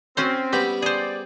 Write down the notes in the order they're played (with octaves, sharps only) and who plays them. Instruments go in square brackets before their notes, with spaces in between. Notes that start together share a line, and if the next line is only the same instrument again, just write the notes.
[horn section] C4 [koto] C#4 F#4 C5
[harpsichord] G3 B3 G5 [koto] G4
[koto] G#4 C5 [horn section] D5